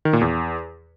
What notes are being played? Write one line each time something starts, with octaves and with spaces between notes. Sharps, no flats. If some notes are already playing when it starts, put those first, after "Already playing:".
D#3
A#2
E2